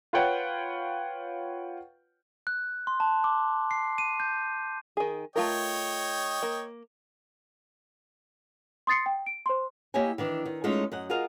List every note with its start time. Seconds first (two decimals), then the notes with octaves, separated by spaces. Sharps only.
0.13 F4 B4 C#5 F#5 G5
2.47 F#6
2.87 C6
3.00 A5
3.24 D6
3.71 C7
3.98 D#7
4.20 G6
4.97 D#3 G#4
5.36 A3 F4 A#4 C#5 D#5 G5
6.43 A#3
8.87 C6 D#6 A6 C7 C#7
9.06 G5
9.26 D7
9.46 C5 C6
9.94 A#3 E4 G4 C#5 D#5 G#5
10.18 D#3 E3 D4
10.45 D#3
10.64 G#3 A3 C#4 D#4 F4
10.92 F#2 D#5 F#5
11.10 F4 F#4 G#4 A#4 D#5 F5